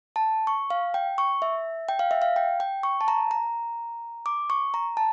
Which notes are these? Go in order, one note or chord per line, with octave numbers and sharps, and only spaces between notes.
A5
C#6
F5
G5
C#6
E5
G5
F5
E5
F5
G5
G5
C#6
A5
A#5
A#5
D6
C#6
A#5
A5